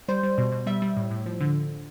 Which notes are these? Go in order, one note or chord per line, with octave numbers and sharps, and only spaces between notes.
G3 C5
G3
B2
B2
G3 E5
G3
A2
A2
F3
D3